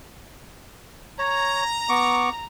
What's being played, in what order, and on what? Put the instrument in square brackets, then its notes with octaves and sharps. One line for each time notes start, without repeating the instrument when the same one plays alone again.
[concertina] C#5 [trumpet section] A#5
[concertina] B3 C#6 D6